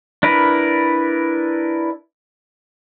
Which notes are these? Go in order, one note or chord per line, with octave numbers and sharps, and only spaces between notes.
D4 E4 A#4 B4